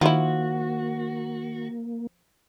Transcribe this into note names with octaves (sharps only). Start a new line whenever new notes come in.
D#3 F3 A#3 E4 F#4